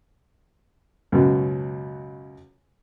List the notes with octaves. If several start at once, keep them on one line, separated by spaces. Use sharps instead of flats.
C#2 F#2 B2